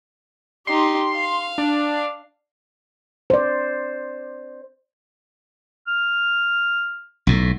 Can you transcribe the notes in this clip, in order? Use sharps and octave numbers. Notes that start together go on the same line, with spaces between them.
D#4 G4 C6
F5
D4
C5 D5
F6
B1 A2